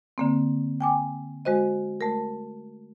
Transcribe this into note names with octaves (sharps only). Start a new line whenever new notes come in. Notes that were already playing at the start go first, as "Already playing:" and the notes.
D3 A#3 C4
G5 G#5 D6
G#3 F#4 C5 D#5
A3 A#4